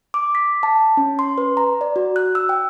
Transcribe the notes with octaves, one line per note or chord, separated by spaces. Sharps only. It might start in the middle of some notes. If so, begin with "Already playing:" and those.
D6
B6
A5
C#4
C6
B4
A#5
D5
F#4
F#6
E6
G5